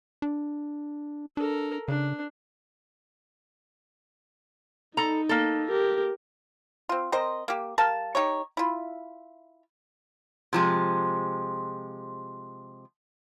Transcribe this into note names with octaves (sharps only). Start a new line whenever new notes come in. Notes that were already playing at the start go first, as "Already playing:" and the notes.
D4
D4 A4 A#4
C#3 D4
D#4 A4 A#5
A#3 A4
G4 A#4
C4 F4
C4 A#4 C5 D#5
A#3 G4
G3 A#4 F5 A5
D#4 G4 C#5
E4 F4
C3 F3 G#3